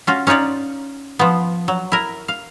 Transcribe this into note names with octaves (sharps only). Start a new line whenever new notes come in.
C#4 F4 F#4
C#4 D#4 F4 C#5 D5
F3 B3
F#3
E4 A#4
F5